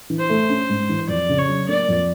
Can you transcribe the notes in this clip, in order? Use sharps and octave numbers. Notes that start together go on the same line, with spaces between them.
E3
C5
A3
C#4
G#2
E3
F2 D5
C#3
C#5
F#3
A#3 D5
F2